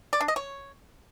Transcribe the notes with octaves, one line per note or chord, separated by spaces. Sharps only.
D5
D4
D#5
C#5